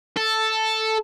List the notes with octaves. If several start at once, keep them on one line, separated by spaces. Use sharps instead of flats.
A4